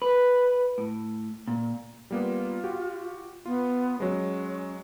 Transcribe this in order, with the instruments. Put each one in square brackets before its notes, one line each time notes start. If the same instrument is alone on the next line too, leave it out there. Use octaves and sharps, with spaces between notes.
[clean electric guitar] B4
A2
A#2
[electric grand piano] G3 A#3 B3 [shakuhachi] F4
[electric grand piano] F#4 G4
[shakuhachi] B3 [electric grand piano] F4
[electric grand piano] F#3 G#3 [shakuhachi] C#4